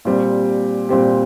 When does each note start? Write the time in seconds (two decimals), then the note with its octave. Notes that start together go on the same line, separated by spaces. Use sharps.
0.05 A#2 G3 C4 G4
0.89 A#2 G3 C4 G4